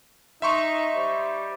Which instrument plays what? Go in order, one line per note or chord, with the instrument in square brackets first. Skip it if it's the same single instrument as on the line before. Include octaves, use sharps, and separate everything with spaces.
[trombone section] D#4 [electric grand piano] E5 C6 C#6
[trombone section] G3 C5